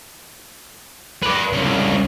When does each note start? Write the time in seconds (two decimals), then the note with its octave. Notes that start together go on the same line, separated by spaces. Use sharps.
1.23 B4 D5
1.53 C2 C#3